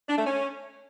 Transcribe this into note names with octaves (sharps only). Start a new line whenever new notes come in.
D4
A3
C#4